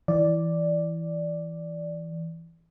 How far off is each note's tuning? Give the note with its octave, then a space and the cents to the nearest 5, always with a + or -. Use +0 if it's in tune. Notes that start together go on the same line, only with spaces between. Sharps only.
E3 +0 D5 +0